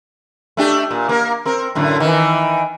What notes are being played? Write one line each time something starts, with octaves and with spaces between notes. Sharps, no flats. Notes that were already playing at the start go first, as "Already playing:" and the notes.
A3 D4 G4
A#2
A#3 A#4
C4 A#4
F#2 A2 D3
D#3 E3